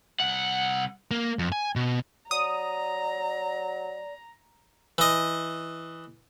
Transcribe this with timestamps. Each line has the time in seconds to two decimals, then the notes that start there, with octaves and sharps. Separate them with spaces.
0.20 C2 F#5
1.11 A#3
1.39 F2
1.52 G#5
1.76 B2
2.31 F#3 D5 A#5 D#6
4.98 E3 D#5